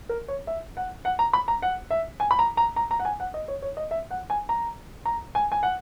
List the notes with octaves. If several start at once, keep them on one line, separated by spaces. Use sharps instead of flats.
A#4
C#5
E5
F#5
F#5
A#5
B5
A#5
F#5
E5
G#5
B5
A#5
A#5
A#5
A#5
F#5
G#5
F#5
D#5
C#5
C#5
D#5
E5
F#5
G#5
A#5
A#5
G#5
G#5
F#5